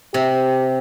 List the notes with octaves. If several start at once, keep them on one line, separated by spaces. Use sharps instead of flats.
C3 G4